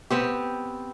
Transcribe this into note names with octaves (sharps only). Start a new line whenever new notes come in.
B3 C4 G4